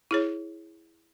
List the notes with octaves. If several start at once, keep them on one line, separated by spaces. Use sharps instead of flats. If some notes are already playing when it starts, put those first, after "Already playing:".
E4 G#4 C#5